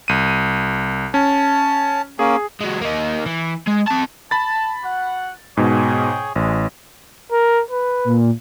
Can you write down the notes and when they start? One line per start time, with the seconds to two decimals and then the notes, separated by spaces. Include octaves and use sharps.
0.08 C2 D#7
1.14 C#4 A5
2.19 A#3 C#4 G#4
2.61 F#3 G#3
2.81 A#3 D#4
3.26 E3
3.68 G#3
3.88 C4 A5
4.31 A5 B5 A6
4.84 F#4 F#5
5.57 G#2 B2 G#4 C#5 G5
6.36 A1 G#3
7.32 A#4
7.71 B4
8.04 A#2